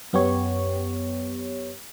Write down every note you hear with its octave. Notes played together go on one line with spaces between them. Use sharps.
F#2 B3 G4 C#5